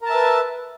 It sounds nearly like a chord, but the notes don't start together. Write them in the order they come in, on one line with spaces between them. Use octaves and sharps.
A#4 A5 E5 B4